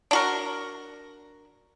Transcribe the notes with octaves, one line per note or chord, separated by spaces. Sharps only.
D4 F#4 A#4